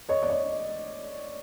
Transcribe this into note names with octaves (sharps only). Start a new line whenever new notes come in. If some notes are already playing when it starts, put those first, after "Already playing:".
C#5 D#5
D5
C#5 D#5